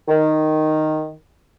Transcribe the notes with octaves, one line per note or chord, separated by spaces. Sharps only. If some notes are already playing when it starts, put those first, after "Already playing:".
D#3